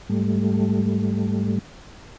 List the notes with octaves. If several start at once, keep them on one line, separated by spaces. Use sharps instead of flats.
G#2 G3 A3